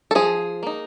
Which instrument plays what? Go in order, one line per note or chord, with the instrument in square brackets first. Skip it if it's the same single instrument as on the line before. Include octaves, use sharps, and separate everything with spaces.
[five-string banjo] A4
F3 G#4
A#3 D#4